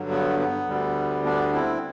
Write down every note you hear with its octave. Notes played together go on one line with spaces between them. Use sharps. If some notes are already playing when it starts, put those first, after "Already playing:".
Already playing: G2 D3 F#3
B3
B3
D2 D3 G3
B3 D4
C4 E4